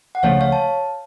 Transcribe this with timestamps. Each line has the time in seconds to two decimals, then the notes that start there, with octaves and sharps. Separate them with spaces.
0.15 F#5
0.23 C#2 C#3 F3 A3 C#5 F5
0.41 C#5 F5
0.52 A5